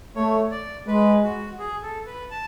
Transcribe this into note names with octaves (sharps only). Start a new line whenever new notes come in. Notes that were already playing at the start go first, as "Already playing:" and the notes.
A3 C#5
D5
G#3 B4
F#4
G#4
A4
B4
A5